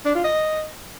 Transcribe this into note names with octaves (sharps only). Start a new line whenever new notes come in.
D4
F4
D#5